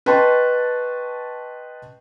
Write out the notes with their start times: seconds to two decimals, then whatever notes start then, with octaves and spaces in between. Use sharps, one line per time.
0.06 B4 D#5 G5 A5 C6 C#6